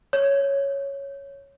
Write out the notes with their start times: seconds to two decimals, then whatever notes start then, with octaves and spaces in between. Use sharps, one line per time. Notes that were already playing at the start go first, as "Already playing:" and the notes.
0.13 C#5